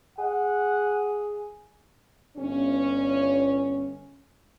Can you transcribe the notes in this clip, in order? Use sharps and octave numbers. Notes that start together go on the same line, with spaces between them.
G#4 F#5
G1 C#4